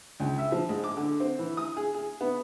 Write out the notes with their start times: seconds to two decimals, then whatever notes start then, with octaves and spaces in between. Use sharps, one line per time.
0.20 C#2
0.38 E5
0.52 F3
0.69 G#2
0.84 D6
0.97 D3
1.20 C4
1.39 E3
1.57 D#6
1.77 G#4
1.94 G#4
2.21 B3